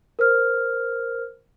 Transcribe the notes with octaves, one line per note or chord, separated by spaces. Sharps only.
A#4 C5 F6